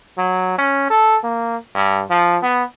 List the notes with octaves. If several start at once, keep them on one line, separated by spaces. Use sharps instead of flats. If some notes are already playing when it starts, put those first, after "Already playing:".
F#3
C#4
A4
A#3
G2
F3
B3